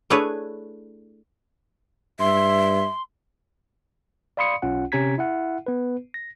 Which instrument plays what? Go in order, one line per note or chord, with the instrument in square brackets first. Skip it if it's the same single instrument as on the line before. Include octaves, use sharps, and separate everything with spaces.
[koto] A3 D4 E4 G#4 B4 C#5
[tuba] G2 [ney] E5 [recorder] C6
[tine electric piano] D5 F5 B5 C6 D#6 C#7
B1 C#4 F4 F#5
C3 C#4 G4 A#5 G#6 B6
E4 E5 F#5
B3 B4
A#6